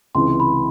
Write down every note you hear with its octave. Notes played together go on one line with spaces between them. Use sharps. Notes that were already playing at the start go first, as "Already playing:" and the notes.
C#2 C3 E3 C6
B5